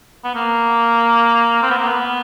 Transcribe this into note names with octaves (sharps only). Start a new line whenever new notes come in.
B3
A#3
C4
B3
A#3
B3